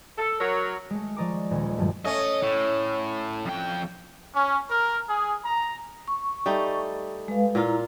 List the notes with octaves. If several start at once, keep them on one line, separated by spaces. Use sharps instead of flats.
A4
F#3 A#4
G#3 A3
F3 D5 D#5 A#5 C#6 D6
D#1 C#4
G2 D#3 F3 F#3 A3
A3 C#4 D#5
A2
F2 G5
C#4
A#4
G#4
A#5
C#6
G3 A3 D#4
G#3 B4 F5
A#2 E4 F4 A#5